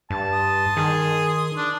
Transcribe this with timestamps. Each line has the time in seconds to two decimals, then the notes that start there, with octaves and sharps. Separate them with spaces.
0.10 G2 A5
0.33 C6 D#6
0.77 D#3 G#4
1.57 D4